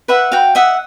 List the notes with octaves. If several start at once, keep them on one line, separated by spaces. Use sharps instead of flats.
B4 E5 F#5
F#4 F5 G5
D#5 E5 F#5